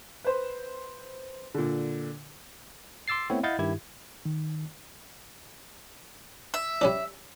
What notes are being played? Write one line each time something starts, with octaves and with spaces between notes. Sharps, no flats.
B4 C5
A#2 D3
C6 D6 E6 A6 C7
A3 B3 C4 E4 C#5
E4 D#5 F5 F#5 G6 A6
G2 D#3 E4 G4 G#6
D#3
E5
G3 C#4 D4